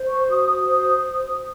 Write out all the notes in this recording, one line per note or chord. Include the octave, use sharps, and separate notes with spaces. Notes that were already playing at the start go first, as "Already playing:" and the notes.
Already playing: C5
C#6
F#4 D#6
C5